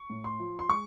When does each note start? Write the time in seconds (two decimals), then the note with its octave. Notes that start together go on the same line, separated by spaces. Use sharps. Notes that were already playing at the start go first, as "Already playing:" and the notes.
Already playing: C#6
0.10 A2
0.24 C6
0.39 F3
0.59 C6
0.69 G#3 C#6